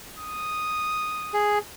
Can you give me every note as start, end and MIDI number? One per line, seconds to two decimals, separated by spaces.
0.19 1.42 87
1.34 1.59 68